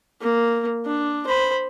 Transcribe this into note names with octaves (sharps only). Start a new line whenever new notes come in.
A#3
D4
C5 B5